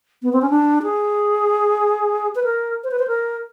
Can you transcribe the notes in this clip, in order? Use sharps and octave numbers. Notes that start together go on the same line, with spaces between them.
B3
C4
C#4
D4
G#4
B4
A#4
C5
B4
C5
A#4